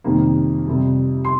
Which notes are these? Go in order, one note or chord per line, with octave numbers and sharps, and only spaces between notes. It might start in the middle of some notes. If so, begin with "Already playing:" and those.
F2 C3 D#3 G3 A#3
F2 C3 G3
C6